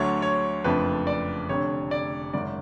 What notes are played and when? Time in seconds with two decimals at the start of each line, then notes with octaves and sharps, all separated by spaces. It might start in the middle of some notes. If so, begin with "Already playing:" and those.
Already playing: D2 D3 F#3 A3 D4 C#5
0.22 C#5
0.64 F#1 F2 F3 A3 D4 B4
1.07 D5
1.49 F1 F2 D3 C#5
1.91 D5
2.33 G#1 F#2 C#3 D5